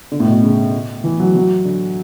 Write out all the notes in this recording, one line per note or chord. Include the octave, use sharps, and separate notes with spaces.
D3
A2
B2
C#3
E3
F#3
F#3
D3